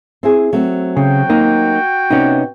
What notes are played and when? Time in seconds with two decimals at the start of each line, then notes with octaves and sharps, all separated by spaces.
0.23 C4 E4 G#4
0.53 F#3 A3 C4
0.97 C#3 F#4 G5
1.29 A#3 D#4
2.11 C3 B3 C#4 D#4